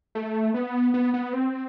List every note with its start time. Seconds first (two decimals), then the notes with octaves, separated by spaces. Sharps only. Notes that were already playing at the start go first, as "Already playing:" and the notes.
0.15 A3
0.54 B3
0.94 B3
1.14 B3
1.33 C4